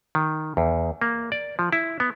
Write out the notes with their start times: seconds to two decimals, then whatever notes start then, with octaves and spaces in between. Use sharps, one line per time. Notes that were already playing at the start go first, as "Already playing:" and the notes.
0.15 D#3
0.57 E2
1.02 A#3
1.32 D5
1.59 F3
1.73 E4
2.00 B3